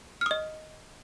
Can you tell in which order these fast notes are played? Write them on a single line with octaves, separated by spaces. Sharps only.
F6 D#6 D#5